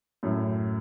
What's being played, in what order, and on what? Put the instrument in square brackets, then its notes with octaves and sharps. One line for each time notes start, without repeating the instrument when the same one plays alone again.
[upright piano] F#2 A2